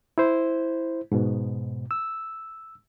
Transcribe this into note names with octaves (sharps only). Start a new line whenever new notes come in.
E4 C5
G#2 B2
E6